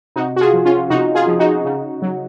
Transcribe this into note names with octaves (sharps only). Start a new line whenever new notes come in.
C3 D#4 F#4
F#4
F4 G#4
F3
C#4 F4
C3 D#4 F#4
F4 G#4
F3
D#4 F#4
C#3
F#3